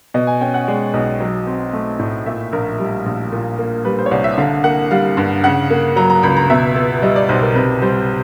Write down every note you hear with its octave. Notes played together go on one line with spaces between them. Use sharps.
B2 D#5
G#5
C#4 G5
F#5
G#3 D5
B1 D#5
F#3
C4
A3
A2
A#2 E5
A#1 A#4
G3
A#1
A#2
A#3
G3 B4
C5
C#5
C2 D5
E5
D3 F5
A#3 F#5
G3 F5
G2
C#3 F#5
A#3
F#3 A#5
A#5
C#2 B5
A#5
B2 E5
B3
G3 D#5
D5
B1 C5
A#4
C3 B4
G3 C5